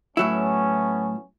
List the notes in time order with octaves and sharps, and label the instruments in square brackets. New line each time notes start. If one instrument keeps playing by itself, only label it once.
[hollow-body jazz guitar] A2 F#3 E4 [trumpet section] A3 B3 C#4